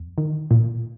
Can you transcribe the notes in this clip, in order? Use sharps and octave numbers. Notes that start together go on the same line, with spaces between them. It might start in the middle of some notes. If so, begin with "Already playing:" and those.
Already playing: F2
D#3
A#2